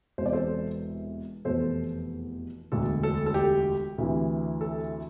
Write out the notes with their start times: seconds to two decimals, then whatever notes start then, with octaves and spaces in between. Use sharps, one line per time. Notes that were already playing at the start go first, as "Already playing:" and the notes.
0.18 E1 C5
0.21 E2 C3 D5
0.33 A4 C5
1.45 F1 E2 B2 A4 C5
2.72 E1 D2 D3 A4
3.03 A4
3.26 A4
3.34 G4
3.98 D2 C3 E3
4.61 A4